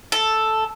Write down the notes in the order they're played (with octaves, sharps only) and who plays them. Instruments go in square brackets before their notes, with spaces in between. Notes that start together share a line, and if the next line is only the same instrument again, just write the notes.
[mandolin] A4